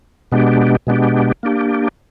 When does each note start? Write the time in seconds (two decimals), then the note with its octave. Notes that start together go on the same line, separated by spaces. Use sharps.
0.32 B2 G#3 B3 D4 G4
0.87 B2 G#3 B3 D4 G4
1.43 A#3 D4 G4